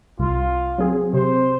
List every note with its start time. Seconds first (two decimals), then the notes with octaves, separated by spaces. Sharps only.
0.19 C2 F4
0.78 F#3 C4 G#4
1.13 C3 C5